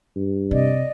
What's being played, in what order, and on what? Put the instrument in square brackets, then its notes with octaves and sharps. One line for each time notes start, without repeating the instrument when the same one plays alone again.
[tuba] G2
[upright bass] C3 [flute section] D5 D#5